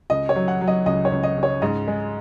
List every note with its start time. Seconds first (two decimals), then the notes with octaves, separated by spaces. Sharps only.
0.10 C#2 D#5
0.29 C#5
0.35 F#3
0.48 F#5
0.61 F#3
0.68 D#5
0.86 C#2 D#5
1.05 C#5
1.12 C#2
1.23 D#5
1.37 C#3
1.43 C#5
1.62 G#2 D#5
1.87 G#3